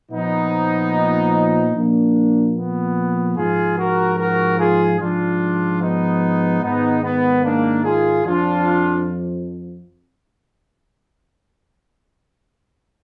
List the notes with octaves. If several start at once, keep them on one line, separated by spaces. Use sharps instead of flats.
A#2 F3 B3 D#4
A#2 F3 A#3 D4
B3
G#2 F3 F4 G#4
F#4 A#4
F#4 A#4
F4 G#4
G#2 F3 D4 F4
B3 D#4
G#2 D#3 B3 D#4
B3
A#3 D4
F4 G#4
F2 F3 D4 F4